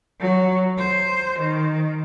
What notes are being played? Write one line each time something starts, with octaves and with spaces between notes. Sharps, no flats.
F#3
C5
D#3